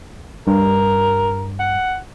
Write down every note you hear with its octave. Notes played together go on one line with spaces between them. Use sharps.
G2 A#4
F#5